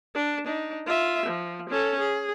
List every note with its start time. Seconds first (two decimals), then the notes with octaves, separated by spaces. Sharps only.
0.15 D4
0.47 D4 D#4
0.86 F4 E5
1.26 F3
1.69 C#4 A4
2.00 G#4